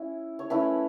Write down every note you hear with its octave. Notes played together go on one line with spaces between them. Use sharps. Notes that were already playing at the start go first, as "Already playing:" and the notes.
Already playing: C#4 E4
C#5
A3 C#4 E4 B4